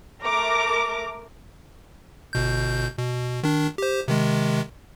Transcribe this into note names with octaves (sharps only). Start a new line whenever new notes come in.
A3 A#4 A#5 D6
G1 B2 G6
B2
D#3 D4
G4 C5
C3 D#3 G#3